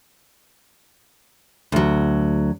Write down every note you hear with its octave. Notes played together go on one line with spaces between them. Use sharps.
D2 F#3